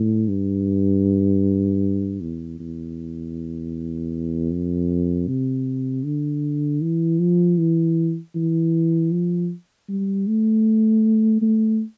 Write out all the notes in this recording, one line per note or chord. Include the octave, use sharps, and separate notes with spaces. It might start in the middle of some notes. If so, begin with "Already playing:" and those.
Already playing: A2
G2
E2
E2
F2
C3
D3
E3
F3
E3
E3
F3
G3
A3
A3